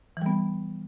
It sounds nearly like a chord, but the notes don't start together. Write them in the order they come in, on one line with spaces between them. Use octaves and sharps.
E3 G3 B3